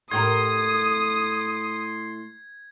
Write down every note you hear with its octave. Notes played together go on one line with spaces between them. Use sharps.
A2 G4 A#4 C6 D#6 G#6